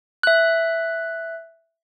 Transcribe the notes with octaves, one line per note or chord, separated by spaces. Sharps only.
E5 F#6